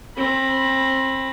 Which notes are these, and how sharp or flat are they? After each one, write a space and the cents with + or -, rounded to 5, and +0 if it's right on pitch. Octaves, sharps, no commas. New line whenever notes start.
C4 +25 B5 +0